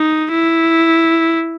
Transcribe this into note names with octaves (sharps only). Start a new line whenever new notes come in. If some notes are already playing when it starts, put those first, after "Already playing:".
Already playing: D#4
E4